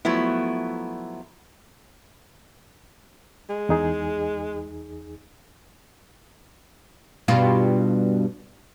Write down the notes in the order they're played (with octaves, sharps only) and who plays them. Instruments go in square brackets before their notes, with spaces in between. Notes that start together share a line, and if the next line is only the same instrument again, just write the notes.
[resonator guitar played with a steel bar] F3 F#3 A3 B3 E4
[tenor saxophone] G#3
[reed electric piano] E2 D#4 G#4
[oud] G2 B2 F4